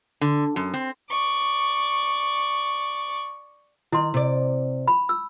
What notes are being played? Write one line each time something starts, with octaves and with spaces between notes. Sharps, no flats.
D3
F#2
C4
D5 C#6
D#3 E4 C6
C3 D5
B5
E6